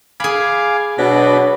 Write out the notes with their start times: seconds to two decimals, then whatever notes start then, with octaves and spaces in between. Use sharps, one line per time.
0.20 G#4 F5 G#5 B5 D6
0.99 B2 F#3 D4 B4